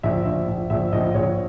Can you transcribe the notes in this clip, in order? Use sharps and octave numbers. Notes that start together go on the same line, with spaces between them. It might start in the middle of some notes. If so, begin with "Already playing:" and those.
A#1 E5
A#1
A#1
A#1 E5
A#1 D#5
A#1 C#5